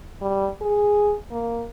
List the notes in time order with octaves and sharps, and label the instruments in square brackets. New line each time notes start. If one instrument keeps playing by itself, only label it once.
[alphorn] G3
G#4
A#3